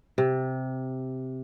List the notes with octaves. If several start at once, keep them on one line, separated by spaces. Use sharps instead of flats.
C3